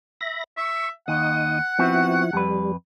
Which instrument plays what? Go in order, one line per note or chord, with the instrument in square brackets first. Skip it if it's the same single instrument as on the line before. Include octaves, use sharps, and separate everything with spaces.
[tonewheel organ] E5 B5 A#6
[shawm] E5 [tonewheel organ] C#6
[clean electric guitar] D#2 [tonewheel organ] D#4 D#6 [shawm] F#5
[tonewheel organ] F3 E4 [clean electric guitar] B3 C4 F#4
[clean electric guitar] F2 B4 [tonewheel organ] G3